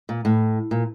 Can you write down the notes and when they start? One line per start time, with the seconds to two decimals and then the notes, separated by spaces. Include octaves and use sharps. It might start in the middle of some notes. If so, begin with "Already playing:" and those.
0.09 A#2
0.25 A2
0.71 A#2